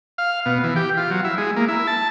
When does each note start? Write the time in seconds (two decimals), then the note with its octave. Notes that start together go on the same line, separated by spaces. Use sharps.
0.18 F5
0.46 B2
0.64 E3
0.76 G4
0.97 F4
1.11 F#3
1.24 E4
1.38 G#3
1.56 A#3
1.68 E4
1.87 A5